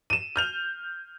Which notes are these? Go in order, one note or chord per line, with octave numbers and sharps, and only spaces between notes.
D#7 E7
F6 G6 F7